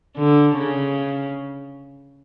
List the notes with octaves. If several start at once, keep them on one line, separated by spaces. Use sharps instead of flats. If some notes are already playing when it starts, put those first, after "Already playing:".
D3
C#3